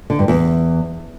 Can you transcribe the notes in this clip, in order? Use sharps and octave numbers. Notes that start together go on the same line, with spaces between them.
D3
G2
E2